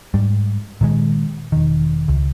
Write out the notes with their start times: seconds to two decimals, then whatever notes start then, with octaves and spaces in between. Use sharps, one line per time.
0.14 G#2 G3
0.81 A#2 D#3 G#3
1.52 E1 D#3
2.08 C#2